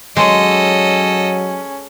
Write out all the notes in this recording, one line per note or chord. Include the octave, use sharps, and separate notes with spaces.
F#3 G#3 C#4 A4 D#5